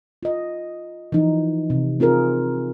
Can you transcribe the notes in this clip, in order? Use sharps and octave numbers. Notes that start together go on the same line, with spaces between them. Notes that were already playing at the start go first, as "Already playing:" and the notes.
F4 D#5
E3 F3 D#4
C3
C4 F4 G#4 A#4